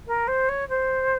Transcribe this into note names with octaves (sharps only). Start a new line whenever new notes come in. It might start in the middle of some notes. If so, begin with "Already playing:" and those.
A#4
C5
C#5
C5